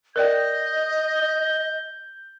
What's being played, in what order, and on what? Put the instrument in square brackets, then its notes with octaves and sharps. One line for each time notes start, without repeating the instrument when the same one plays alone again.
[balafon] A#4 D5 G5 [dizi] D#5 [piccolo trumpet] G6